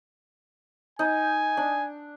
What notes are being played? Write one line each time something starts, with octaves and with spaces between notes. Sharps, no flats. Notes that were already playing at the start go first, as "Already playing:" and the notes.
D#4 G#5
D4